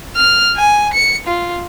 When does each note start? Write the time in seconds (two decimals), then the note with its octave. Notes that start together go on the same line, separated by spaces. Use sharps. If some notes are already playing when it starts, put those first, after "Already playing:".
0.16 F6
0.56 G#5
0.94 C#7
1.27 F4